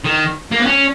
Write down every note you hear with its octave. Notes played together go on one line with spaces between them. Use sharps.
D#3
A#3
B3
C#4